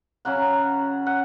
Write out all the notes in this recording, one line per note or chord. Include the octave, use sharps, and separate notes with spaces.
C#3 F#3 C#4 F#5
F#5